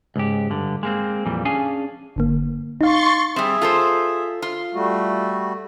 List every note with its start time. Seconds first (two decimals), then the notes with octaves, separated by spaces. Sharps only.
0.16 C#2 G#2 G4
0.50 G2 D3
0.83 G#3 A#3 C4
1.25 F2 A#2 E3 G3
1.45 C#4 D4 G#4 F5 G#5
2.16 G1 D3 A#3
2.81 D#4 F5 C6 C#6 A6
3.36 G3 C4 G#4 E5
3.61 F4 A4 C5
4.42 F4
4.74 G3 A3 F#4